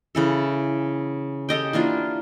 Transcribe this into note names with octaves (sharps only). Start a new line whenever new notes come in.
C#3 E3 A4
G4 A4 D#5 G5
E3 A#3 D4 F4